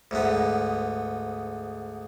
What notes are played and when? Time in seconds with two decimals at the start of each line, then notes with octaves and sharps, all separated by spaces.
0.11 D2 G#2 B3